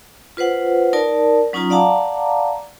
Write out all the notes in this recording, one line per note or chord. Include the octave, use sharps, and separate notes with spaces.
F4 B4 C5 F#5
D#4 A#4 D5 A5
F#3 C#4 D#4 F4 A#5 D#6
D5 F5 F#5 A5 A#5 D6